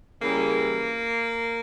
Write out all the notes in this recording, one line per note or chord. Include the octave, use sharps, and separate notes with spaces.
C#3 E3 G3 A#3